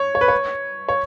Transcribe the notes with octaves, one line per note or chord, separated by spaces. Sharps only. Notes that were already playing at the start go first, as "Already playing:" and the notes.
Already playing: C#5
C#5
B4
C#5
C#5